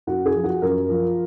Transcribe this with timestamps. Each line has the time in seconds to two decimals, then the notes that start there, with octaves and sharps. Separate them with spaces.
0.07 F#2 F#4
0.26 G#4
0.34 F3
0.44 F#4
0.62 F#2 A#4
0.89 F3